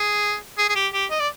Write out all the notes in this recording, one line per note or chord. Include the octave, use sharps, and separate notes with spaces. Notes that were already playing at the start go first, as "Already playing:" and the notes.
Already playing: G#4
G#4
G#4
G4
G4
D#5
D5